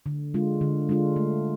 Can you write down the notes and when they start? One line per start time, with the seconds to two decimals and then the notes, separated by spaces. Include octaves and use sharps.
0.06 D3
0.34 G#3 D4 F4
0.61 D3
0.89 G#3 D4 F4
1.16 A3